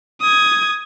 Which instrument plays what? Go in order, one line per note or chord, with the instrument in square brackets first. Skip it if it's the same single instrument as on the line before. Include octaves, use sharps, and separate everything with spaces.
[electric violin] D#6 G#6